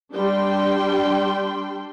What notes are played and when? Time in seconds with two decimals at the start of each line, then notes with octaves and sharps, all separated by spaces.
0.13 G3 D4 G5 C6